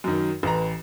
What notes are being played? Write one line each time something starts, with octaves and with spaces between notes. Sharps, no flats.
F#2 D#3
A1 B4 A#5